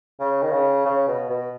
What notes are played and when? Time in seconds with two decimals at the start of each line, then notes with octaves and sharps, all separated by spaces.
0.20 C#3
0.43 D#3
0.53 C#3
0.86 C#3
1.07 B2
1.30 B2